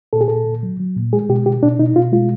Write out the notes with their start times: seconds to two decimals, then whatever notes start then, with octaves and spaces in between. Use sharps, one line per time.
0.13 A#2 A4
0.21 G#4
0.28 A#2 A4
0.46 A#2
0.63 F#3
0.80 F#3
0.96 A#2
1.13 G#3 G#4
1.29 B2 G4
1.46 B2 G4
1.63 B2 D4
1.79 B2 D#4
1.96 B2 F4
2.12 G#3 F4